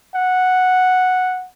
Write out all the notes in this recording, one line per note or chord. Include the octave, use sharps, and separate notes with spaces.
F#5